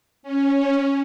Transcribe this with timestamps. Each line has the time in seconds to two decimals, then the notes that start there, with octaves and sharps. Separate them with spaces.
0.23 C#4